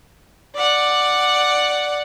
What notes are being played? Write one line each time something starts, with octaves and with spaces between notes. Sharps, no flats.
D5 F#5